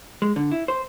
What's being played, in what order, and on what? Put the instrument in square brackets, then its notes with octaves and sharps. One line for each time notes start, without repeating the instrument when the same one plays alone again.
[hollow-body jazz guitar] G#3
D3
E4
C5